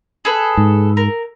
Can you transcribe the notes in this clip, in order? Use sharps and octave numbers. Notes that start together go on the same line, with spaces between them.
G#4 A4 B4
G#2
A#4